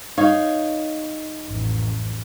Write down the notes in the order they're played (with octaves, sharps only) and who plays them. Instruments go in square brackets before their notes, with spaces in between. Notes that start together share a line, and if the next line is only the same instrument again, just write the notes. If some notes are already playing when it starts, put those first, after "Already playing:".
[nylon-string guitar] D#4 [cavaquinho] C#5 [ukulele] F5
[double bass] A1 F2